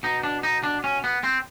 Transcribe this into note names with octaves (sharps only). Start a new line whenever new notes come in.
B2 D#4
D4
D#4
D4
C#4
B3
C4